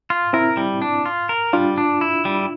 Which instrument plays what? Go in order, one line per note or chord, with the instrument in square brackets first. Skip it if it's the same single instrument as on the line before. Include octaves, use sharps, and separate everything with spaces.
[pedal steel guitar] F4
[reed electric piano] C4 E4 [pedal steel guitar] A#4
[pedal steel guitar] G3
D4
F4
A#4
[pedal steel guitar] G3 [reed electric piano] D4 F4
[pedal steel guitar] D4
E4
G3